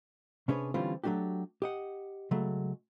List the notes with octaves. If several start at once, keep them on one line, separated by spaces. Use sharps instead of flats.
C3 C#4 D4 G#4 B4 C#5
D3 E3 G3 C4 C#4 F4
F#3 A3 D4 F#4 G4
G4 D#5 F#5
C#3 F#3 G#3 A3